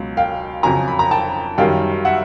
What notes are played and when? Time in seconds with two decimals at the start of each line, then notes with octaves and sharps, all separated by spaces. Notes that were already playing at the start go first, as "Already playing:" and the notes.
Already playing: C#2 B2 F#3
0.17 F5 G5
0.63 F2 C#3 F#3 G#5 A#5
0.88 B5
0.99 A#5
1.11 G5 A5
1.58 F#2 D#3 G3 F5 G5
2.05 E5 F#5